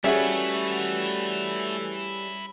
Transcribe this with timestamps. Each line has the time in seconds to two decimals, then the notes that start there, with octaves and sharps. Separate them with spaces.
0.04 G3 A3 C#4 E4 F#4 G#4 B4 E5